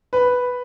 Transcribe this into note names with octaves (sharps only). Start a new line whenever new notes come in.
B4